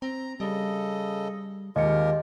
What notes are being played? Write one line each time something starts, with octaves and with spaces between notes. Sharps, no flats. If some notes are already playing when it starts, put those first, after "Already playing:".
C4 A#5
C#3 G3 A4 D#5
D#2 G#3 F4 G4 A#4 D#5 C#7